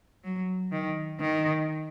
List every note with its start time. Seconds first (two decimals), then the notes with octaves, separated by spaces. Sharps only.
0.24 F#3
0.72 D#3
1.20 D#3